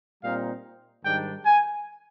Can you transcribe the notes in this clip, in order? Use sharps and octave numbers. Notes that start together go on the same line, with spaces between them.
A#2 G3 C4 D#4 F5
G#2 D#3 G3 D4 G5
G#5